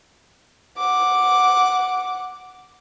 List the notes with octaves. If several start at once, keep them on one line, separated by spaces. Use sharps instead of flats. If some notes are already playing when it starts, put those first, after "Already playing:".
F#5 D6